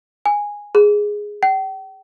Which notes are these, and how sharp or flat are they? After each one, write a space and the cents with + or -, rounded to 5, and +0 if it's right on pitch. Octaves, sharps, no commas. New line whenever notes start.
G#5 -10
G#4 +0
G5 -40